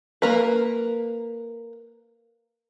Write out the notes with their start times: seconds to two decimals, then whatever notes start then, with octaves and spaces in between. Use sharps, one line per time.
0.22 A#3 A#4 B4